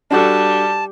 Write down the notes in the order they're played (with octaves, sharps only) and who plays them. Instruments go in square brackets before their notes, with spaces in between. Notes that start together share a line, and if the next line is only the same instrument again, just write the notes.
[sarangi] G3 [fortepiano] D4 F#4 A4 [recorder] A5